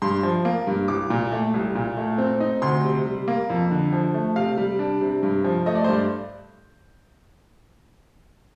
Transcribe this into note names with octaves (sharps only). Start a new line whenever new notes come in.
G2 C6
F3
A#3
G2
C2 D6
A#2
A3
C2
A#2
A3
C4
D#4
D2 C6
C3
G3
A#3
F2
D3
F3
A3
C3 F5
G3
D4
C3
G2
F3
A3 D#5
D5
C5
G2 D5